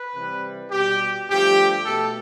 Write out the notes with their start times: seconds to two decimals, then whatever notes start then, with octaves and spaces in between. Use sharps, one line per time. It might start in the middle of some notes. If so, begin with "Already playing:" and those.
Already playing: B4
0.14 C3 E3 G3
0.71 B2 G3 G4
1.28 G2 F3 A3 G4
1.85 B2 A3 A4